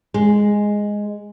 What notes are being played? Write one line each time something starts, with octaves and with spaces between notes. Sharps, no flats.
G#3